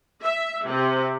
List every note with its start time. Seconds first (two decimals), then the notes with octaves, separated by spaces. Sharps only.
0.22 E5
0.67 C3